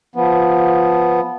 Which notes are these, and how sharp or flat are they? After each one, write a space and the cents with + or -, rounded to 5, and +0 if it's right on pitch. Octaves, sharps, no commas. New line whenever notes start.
F3 +0 B3 +0